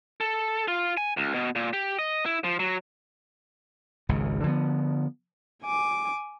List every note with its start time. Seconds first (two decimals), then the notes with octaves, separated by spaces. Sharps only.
0.21 A4
0.68 F4
0.97 G#5
1.17 C#2
1.34 B2
1.56 A#2
1.73 G4
1.99 D#5
2.25 E4
2.44 F3
2.59 F#3
4.09 G#1 C#2 C#3
4.44 D3 F3 G#3 B3
5.64 G#5 D6